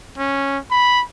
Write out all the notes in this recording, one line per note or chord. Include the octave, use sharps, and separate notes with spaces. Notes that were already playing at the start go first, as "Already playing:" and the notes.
C#4
B5